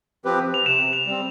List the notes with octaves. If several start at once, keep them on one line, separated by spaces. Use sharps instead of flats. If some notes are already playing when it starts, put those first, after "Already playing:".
F3 C4 G4 B4
F7
C3 E7
F7
G3 C4